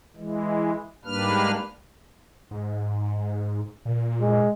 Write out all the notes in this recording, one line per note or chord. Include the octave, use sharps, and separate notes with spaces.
E3 G#3
G#2 G3 A#3 D4 B4 F6
G#2
A#2
G#3